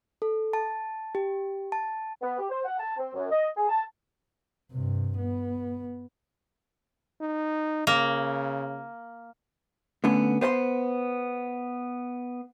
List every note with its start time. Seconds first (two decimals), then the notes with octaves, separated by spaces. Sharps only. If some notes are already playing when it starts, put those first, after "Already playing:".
0.22 A4
0.53 A5
1.15 G4
1.72 A5
2.22 B3
2.38 G4
2.50 C5
2.65 F#5
2.79 A5
2.97 C4
3.14 F#2
3.31 D#5
3.56 G#4
3.69 A5
4.72 G2 C3
5.18 B3
7.21 D#4
7.87 C#3 A#3
10.04 D3 A3 B3 C#4
10.41 B3 C5 F5 C6